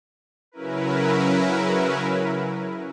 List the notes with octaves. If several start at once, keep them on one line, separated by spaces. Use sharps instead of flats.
C#3 F#3 C#4 E4 A#4 B4